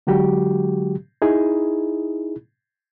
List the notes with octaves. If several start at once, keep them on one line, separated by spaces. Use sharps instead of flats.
D3 F#3 G#3 F#4 G4
D#4 E4 G#4